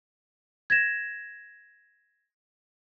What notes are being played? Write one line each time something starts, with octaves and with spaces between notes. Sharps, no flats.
G#6 A#6 E7